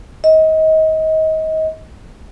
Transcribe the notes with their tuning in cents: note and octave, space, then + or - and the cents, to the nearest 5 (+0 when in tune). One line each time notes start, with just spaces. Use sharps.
D#5 +25